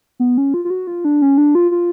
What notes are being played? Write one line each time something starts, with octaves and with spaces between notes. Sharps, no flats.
B3
C#4
F4
F4
F#4
F4
D4
C#4
D4
F4
F4